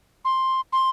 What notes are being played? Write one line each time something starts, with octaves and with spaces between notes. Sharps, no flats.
C6
C6